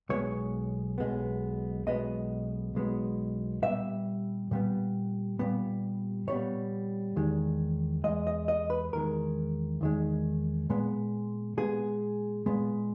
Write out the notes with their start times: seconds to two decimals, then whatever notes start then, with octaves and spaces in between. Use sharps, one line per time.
0.09 B1 B2 G#3 B3 C#5
0.98 B1 B2 G#3 B3
1.86 B1 B2 G#3 B3 D#5
2.75 B1 B2 G#3 B3
3.62 A#2 G3 B3 E5
4.51 A#2 G3 B3
5.39 A#2 G3 B3
6.27 A#2 G3 B3 C#5
7.16 E2 D#3 G#3
8.04 E2 D#3 G#3 D#5
8.27 D#5
8.48 D#5
8.70 B4
8.93 E2 D#3 G#3 A#4
9.81 E2 D#3 G#3
10.70 A#2 G#3 B3
11.57 A#2 G#3 B3 G#4
12.46 A#2 G#3 B3